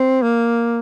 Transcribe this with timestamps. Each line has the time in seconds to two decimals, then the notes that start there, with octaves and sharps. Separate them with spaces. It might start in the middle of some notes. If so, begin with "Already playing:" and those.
Already playing: C4
0.22 A#3